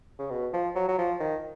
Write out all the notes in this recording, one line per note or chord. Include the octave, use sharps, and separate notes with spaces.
C#3
B2
F3
F#3
F#3
F3
D#3